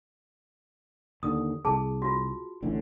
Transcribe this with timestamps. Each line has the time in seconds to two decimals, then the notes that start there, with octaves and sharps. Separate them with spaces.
1.23 D#2 D3 D#6
1.65 C2 G#4 A5
2.02 F4 F#4
2.62 A1 A2 D3